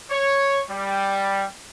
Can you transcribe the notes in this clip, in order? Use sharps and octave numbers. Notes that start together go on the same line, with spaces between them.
C#5
G3